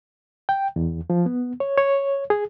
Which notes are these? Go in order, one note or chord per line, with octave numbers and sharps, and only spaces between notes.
G5
E2
F3
B3
C#5
C#5
G#4